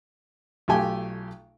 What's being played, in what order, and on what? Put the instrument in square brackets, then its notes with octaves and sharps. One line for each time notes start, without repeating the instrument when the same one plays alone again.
[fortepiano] B1 A3 F4 G4 G5 G#5